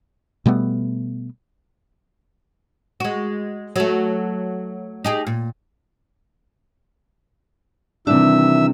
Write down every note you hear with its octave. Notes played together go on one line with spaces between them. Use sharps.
B2 G3 A3 B3
G#3 F#4
F#3 A3
D#4 G4 G#4
A#2
C3 D#3 E3 G3 D4 E5 E6